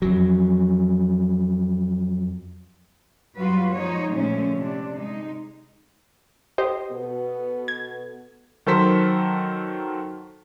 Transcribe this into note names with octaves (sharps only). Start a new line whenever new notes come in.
F2 F#3
F#2 F#3 G3 F4 F#4 B4
F3 G3 G#3 D#4 C#5
A#2 D3 F3 G#3 A3 C#4
C3 D4
G#3 D#4
G4 C5 D#5
B2 B3 A4
G#6
D#3 F#3 A4 A#4 C5 B6